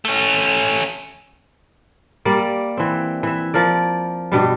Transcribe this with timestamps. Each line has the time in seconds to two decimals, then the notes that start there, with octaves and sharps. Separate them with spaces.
0.05 A3 C#4
2.25 G3 A#3 D5
2.77 E3 C4
3.23 E3 E5
3.54 F3 A#4 D5
4.32 G2 B2 G3